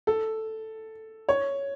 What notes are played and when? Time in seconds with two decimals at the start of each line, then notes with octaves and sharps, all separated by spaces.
0.07 A4
1.29 C#5